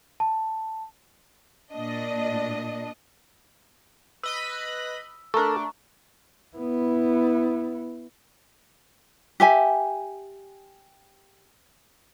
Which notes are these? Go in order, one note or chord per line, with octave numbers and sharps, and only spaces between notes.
A5
A#2 D4 D#5
B4 D#5 B5 E6
A3 D4 A4 A#4 A#5 C#6
B3 E4
G4 E5 G#5